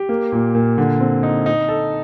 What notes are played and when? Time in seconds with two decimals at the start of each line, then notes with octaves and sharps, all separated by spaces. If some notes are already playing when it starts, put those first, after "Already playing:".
Already playing: G4
0.09 A#3
0.32 A#2
0.55 A#2
0.78 D3
1.00 C4
1.23 D#4
1.46 D#4
1.69 A4